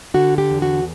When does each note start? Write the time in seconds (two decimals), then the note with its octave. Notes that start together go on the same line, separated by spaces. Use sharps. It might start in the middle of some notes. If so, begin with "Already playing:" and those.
0.14 D3 F#4
0.38 G4
0.50 E2
0.62 F#4